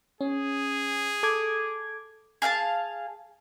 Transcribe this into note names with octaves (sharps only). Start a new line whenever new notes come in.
C#4 G#4
A4 D6 G#6
G#4 F5 G5 A5